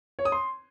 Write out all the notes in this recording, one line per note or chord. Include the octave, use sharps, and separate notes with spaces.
C#5
D#6
C6